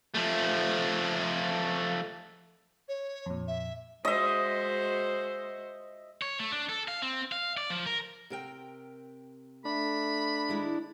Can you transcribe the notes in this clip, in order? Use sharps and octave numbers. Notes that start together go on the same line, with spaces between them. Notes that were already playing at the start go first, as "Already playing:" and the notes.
F3 A3
C#5
F2 A#2
E5
G#3 F#4 C5 D#5 E5
C#5
A3
D4
A4
F5
C4
F5
D5
F3
A#4
C3 A#4 G5
A3 D4 B5
D#3 G#3 E4